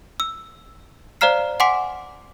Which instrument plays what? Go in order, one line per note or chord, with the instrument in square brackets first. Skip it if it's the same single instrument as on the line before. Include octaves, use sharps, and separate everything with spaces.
[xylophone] E6
C5 D5 F5 A#5 F6 C7
F#5 G#5 C6 D6 B6